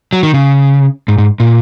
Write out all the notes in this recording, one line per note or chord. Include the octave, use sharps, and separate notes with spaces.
F#3
D#3
C#3
G#2
G#2
A#2